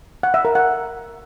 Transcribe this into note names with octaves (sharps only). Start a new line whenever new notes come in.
F#5
E5
A#4
F#5